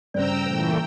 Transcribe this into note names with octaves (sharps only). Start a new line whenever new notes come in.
G2 C#3 C5 D5 G5 A#5 E6
A#2 E3 A3 C5 G5